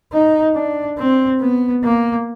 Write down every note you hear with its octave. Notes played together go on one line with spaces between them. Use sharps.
D#4
D4
C4
B3
A#3